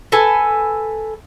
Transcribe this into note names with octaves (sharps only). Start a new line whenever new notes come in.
A4 B4 G#5